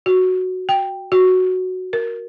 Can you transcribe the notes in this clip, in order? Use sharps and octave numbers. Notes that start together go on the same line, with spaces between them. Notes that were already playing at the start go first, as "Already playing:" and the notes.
F#4
G5
F#4
A#4